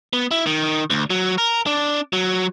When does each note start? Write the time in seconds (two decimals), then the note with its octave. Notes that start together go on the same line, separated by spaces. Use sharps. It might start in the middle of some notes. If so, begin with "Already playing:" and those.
0.13 B3
0.31 E4
0.46 D#3
0.90 D2
1.10 F#3
1.38 A#4
1.66 D4
2.13 F#3